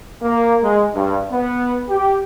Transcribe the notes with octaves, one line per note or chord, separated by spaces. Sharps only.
A#3
G#3
G2
B3
G4